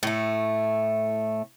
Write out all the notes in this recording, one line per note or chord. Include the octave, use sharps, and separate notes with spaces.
A2 A3